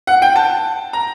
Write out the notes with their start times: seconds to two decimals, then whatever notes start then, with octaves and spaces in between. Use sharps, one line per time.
0.07 F#5
0.22 G5
0.36 A5
0.93 A#5